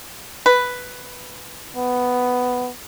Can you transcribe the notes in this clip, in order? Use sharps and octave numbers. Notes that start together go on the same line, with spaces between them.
B4
B3